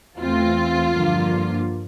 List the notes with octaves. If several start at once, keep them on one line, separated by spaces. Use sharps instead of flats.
E2 E3 A3 C4 F4
G2 D3 F3 A#3